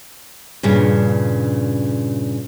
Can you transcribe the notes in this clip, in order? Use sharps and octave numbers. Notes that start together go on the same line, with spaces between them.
G2 A#2 C#3